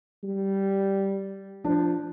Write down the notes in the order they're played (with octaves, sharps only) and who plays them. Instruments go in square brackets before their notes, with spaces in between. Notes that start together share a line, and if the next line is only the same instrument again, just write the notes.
[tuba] G3
[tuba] F3 [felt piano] D4